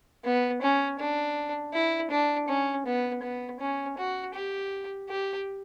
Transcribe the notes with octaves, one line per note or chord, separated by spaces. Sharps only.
B3
C#4
D4
E4
D4
C#4
B3
B3
C#4
F#4
G4
G4